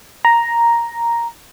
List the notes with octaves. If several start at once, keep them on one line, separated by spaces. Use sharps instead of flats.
A#5